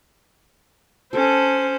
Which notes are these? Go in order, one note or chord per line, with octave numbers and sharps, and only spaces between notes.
C#4 A4 C5